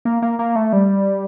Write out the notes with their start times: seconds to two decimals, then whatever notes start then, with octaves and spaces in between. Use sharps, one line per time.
0.05 A#3
0.22 A#3
0.39 A#3
0.56 A3
0.73 G3